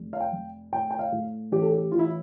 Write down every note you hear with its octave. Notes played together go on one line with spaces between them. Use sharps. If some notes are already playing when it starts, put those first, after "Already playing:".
Already playing: F1
F5
G5
F1
A2 G5
G5
F5
A2
A1 G4
A4
G4
E3 F4
E4